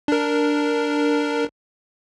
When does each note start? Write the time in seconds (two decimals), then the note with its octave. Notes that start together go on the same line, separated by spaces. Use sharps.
0.08 D4 A#4